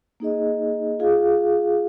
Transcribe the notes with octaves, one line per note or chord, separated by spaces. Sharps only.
A#3 D#4 G#4 D#5
F4 G#4 F5